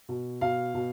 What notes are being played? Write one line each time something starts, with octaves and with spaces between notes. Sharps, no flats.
B2
B2 F5
B2